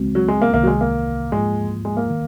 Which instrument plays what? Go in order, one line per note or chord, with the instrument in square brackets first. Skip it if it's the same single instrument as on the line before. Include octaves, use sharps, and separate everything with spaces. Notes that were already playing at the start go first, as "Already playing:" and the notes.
Already playing: [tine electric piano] C#2 C#3 G#3 C4 F#4
[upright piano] F#3
G#3
A#3
[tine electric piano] C2 C3 D#3 [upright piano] A#3
[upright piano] F#3
G#3
A#3
[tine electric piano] G#2 F3 A#3 F4 [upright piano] G#3
[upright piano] G#3
A#3
[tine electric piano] D#3